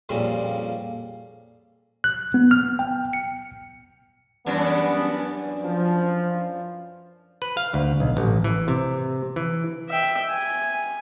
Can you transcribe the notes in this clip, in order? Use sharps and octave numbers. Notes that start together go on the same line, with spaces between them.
F2 A#2 C#3 G3 B5
F#6
B3
F6
G5
C#7
F#2 E3 G3 B3 D4
F3
B4
F5
D2
B1
A1
E3
C3
E3
E5 G5
G#5